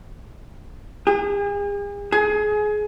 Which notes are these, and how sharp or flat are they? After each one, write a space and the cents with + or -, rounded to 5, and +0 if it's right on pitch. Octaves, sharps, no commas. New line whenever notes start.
G#4 -45
G#4 +25